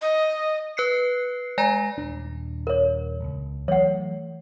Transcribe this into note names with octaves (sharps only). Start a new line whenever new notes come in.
D#5
B4 F#6 C7 C#7
G#3 D5 G#5 A#5 A#6
D#1 D4
A#4 C#5
D#1 C#2
E3 F#3 A3 C#5 F#5